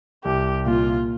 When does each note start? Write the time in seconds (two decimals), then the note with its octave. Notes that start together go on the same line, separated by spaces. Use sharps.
0.24 C2 G4
0.66 A#2 F4